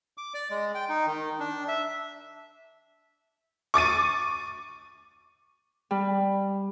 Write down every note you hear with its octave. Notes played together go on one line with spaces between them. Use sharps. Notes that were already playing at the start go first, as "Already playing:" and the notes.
D6
D5
G#3
G5
D#4
D#3
D4
E5
C#6 D6 A6 D#7
G3